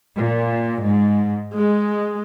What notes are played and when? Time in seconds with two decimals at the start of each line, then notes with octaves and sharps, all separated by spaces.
0.17 A#2
0.85 G#2
1.56 G#3